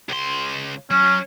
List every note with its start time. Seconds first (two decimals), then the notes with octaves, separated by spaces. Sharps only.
0.09 C#2 C6
0.91 F#3 C#4